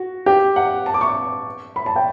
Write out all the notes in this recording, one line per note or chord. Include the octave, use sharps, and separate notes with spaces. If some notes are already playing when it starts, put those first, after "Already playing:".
Already playing: F#4
G4
F#5
A5
D6
C#6
B5
A5
G5